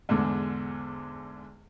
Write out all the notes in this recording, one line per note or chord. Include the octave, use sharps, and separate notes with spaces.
E2 G#2 D3